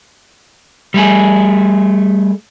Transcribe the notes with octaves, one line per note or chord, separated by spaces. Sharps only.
G3 A3 G#4